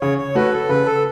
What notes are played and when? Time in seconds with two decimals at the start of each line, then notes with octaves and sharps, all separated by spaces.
0.01 C#3 C#5
0.18 C#5
0.35 A3 F#4 B4
0.52 A4
0.69 C#3 B4
0.85 A4